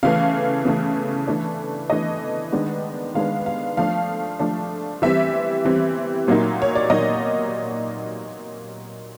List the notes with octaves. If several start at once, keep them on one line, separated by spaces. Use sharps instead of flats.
C#3 E3 A3 F5
C#3 E3 A3
E3 A3 D4
E3 A3 D4 D#5
D#3 G#3 B3 D4
D#3 G#3 B3 D4 F5
F5
F3 A3 D4 F5
F3 A3 D4
E3 G3 C4 E5
E3 G3 C4
A#2 F#3 A#3 D#4
C#5
D5
A#2 F#3 A#3 D#4 D#5